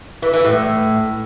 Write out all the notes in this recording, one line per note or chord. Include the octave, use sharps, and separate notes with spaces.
E3
E3
A2